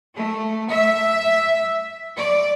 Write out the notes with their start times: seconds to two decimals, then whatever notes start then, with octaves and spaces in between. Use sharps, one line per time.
0.16 A3
0.69 E5
2.16 D5